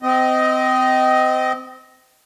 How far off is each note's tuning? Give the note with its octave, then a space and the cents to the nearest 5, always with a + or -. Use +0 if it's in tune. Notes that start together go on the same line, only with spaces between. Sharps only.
C4 -25 D#5 +5